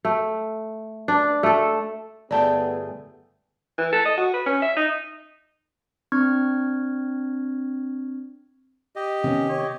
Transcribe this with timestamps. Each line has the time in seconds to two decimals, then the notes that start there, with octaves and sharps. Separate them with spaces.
0.05 A3
1.08 D4
1.43 A3 A4
2.31 G1 A3 B3 G#4 D5 G5 A5
3.78 E3
3.92 A4
4.05 D#5
4.17 F#4
4.34 B4
4.46 C#4
4.62 E5
4.76 D#4
6.12 C4 D4 C#6 F6 G#6
8.96 G4 D#5
9.24 C3 D#3 B3 C#4
9.49 C#5